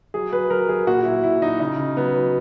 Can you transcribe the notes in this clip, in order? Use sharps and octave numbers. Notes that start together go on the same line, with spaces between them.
F#3 G#4
F#3 B4
F#3 A#4
F#3 G#4
A#2 F#4
F#3 E4
A#2 E4
F#3 D#4
C#3 D#4
C#3
F#3 B3
F#3